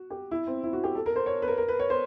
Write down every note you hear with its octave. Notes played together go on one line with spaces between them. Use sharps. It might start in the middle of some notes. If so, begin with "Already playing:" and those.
Already playing: F#4
G4
E4
C4
E4
F#4
G4
A4
A#4
C5
C#5
B4
A#4
A#4
B4
C#5
C5